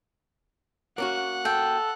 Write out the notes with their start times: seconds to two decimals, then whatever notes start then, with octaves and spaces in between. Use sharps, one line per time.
0.98 A#3 C#4 F#4 F#5
1.45 A4 G5